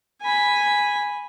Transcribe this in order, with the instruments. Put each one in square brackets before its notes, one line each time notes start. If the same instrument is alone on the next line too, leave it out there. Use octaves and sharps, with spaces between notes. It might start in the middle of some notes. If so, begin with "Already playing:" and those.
[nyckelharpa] G#5 B5